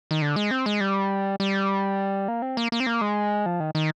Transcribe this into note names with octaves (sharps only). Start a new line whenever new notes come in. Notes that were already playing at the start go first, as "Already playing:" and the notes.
D#3
D3
G#3
C4
G#3
G3
G3
A#3
C4
A#3
A#3
C4
A#3
G#3
F3
D#3
D#3